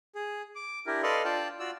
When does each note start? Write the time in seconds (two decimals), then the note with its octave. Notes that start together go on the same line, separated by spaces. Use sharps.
0.15 G#4
0.55 D6
0.86 D4 E4 G4 A#4
1.03 A4 B4 D5 D#5 F5 C6
1.25 D4 F4 D5 G5 A5
1.60 F4 F#4 D5 E6